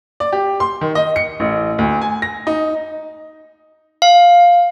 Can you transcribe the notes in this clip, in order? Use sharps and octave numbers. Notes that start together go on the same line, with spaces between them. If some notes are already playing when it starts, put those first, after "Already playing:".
D5
G4
C6
D#3
D#5
C#7
A1
D2
G#5
A#6
D#4
F5